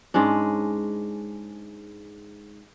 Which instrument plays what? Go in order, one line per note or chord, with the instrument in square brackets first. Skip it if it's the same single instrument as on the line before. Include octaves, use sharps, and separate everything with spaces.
[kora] G#2 G#3 C#4 D4